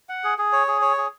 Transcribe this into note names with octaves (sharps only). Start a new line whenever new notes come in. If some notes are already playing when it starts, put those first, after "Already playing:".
F#5
G#4
G#4
C#5
G#4
C#5
G#4